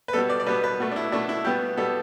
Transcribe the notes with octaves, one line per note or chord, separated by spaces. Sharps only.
B4
B2 G3 B3 A4
D5
D5
B2 G3 B3 B4
B4
B2 A3
D4
E4
B2 A3 D4
E4
B2 G3 B3 G4
B2 G3 B3 A4